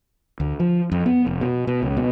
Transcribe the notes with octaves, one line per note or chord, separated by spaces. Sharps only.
D2
F3
F2
B3
F1
B2
B2
C#2
B2